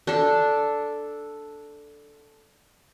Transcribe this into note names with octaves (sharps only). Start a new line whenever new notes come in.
D4 A4